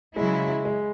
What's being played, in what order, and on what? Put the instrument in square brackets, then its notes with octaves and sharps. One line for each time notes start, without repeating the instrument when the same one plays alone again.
[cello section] C#3 F#3 E4 [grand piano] G#3
[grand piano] G#3